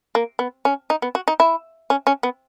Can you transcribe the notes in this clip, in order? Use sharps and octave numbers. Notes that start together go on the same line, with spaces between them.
A#3
B3
C#4
D#4
B3
F#4
D#4
E4
C#4
C#4
B3